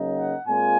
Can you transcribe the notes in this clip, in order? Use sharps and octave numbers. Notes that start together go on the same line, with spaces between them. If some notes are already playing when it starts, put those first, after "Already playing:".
Already playing: C#3 F#3 A#3 D#4
F#5
A#2 G#3 C4 F4 G#5